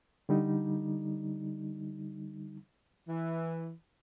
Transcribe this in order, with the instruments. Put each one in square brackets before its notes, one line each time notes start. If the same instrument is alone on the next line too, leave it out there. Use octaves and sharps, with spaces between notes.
[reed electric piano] D3 G3 D#4
[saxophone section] E3